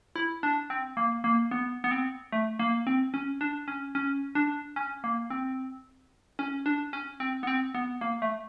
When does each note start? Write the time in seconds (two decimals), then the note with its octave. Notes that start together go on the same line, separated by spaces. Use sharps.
0.16 E4
0.43 D4
0.70 C4
0.97 A#3
1.24 A#3
1.51 B3
1.84 B3
1.91 C4
2.32 A3
2.59 A#3
2.87 C4
3.14 C#4
3.41 D4
3.68 C#4
3.95 C#4
4.35 D4
4.76 C#4
5.04 A#3
5.30 C4
6.39 C#4
6.66 D4
6.93 C#4
7.20 C4
7.43 B3
7.47 C4
7.75 B3
8.01 A#3
8.22 A3